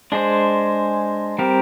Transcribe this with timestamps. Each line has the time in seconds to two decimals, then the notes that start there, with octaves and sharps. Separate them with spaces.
0.12 G#3 D4 G#4 C5
1.38 G3 C4 G4 A#4